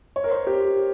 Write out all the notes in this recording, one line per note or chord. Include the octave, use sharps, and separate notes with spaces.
C#5
A#4
C5
G4